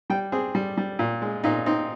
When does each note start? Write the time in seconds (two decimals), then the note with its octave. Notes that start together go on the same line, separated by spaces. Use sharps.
0.10 G3 G5
0.32 C4 G#4
0.55 G3
0.77 G3
0.99 A#2
1.22 G#3
1.44 A#2 D#4
1.66 C4 D#4